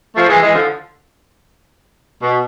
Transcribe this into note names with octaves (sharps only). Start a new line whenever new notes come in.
F3 A3
E3 G#3
E3 G#3
D3 F3
B2